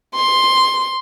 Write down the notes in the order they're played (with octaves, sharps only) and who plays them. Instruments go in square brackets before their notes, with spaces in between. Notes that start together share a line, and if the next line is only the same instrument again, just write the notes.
[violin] C6